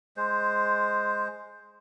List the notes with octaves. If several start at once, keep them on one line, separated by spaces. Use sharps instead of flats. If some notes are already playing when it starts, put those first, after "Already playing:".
G#3 C5